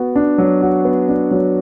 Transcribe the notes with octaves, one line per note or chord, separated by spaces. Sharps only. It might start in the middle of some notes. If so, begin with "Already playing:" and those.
Already playing: B3 F#4
D4
F#3
F#4
B3
D4
F#3